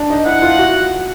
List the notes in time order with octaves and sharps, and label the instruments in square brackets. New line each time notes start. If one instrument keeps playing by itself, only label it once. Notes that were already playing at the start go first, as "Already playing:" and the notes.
Already playing: [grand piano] D4
D#4
[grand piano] E4 [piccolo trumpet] F#5
[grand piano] F4
F#4